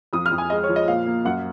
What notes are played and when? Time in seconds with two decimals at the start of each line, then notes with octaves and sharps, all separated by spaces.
0.13 F2 D#6
0.26 F6
0.31 F2
0.38 G#5
0.50 G#3 D#5
0.64 C#5
0.69 F3
0.76 D#5
0.87 A#2 F5
1.06 A#3
1.25 F#2 F#5